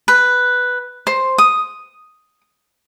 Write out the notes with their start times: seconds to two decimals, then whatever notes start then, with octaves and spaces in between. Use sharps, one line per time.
0.08 B4
1.07 C5
1.38 D#6